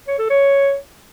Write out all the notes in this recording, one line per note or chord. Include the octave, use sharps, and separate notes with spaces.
C#5
A4
C#5